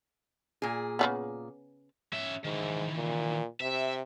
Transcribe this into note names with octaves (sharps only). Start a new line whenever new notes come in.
A#2 G#4
C#3 F3 B3
C#4 E5
G#2 D#3 E3
A#2
C3 E5